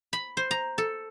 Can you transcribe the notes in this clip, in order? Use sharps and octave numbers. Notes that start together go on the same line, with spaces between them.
B5
C5
A#5
A4